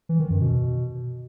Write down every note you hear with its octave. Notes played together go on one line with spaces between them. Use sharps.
E3
D#3
F#2
B2